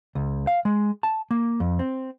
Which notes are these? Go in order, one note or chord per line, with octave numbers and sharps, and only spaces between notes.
C#2
F5
G#3
A5
A#3
F2
C4